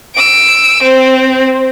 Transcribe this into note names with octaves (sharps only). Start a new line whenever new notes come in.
E6 D7
C4